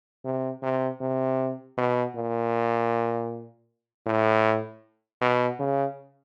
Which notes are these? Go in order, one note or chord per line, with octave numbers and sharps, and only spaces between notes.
C3
C3
C3
B2
A#2
A2
B2
C#3